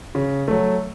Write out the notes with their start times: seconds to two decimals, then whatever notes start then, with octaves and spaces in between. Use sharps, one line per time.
0.15 C#3
0.48 F#3 A3